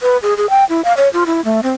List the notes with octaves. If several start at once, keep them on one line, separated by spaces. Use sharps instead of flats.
B4
G#4
G#4
G5
E4
F5
C#5
F4
E4
A3
C4